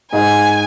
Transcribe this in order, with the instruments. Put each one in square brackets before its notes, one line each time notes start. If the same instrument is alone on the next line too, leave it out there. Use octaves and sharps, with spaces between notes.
[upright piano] G#2 [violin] G#5